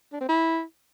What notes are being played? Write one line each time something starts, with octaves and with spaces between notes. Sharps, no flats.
D4
C4
E4